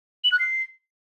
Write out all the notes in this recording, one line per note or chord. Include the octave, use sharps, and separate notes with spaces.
F#7
F#6
C7